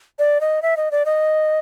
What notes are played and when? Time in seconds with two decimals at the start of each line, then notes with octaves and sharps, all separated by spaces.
0.19 D5
0.41 D#5
0.62 E5
0.77 D#5
0.91 D5
1.05 D#5